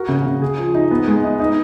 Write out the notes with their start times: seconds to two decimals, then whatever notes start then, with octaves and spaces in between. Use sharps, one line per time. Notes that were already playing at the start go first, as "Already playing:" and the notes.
Already playing: F#4 A#4
0.09 C#3
0.26 C#3
0.42 G#4
0.58 F3
0.74 D#4
0.91 B3
1.08 G#3
1.24 D#4
1.40 D#4